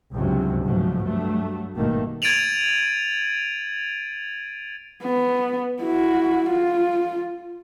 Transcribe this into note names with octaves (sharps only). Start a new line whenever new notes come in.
C#2 G2 C3 F#3
G#2 B2 F3 F#3 A3
G2 F#3 A3
G#1 G2 B2 D#3 A3 A#3
G#6 A6 D7 D#7 F7 F#7
B3
E4 F#4
F4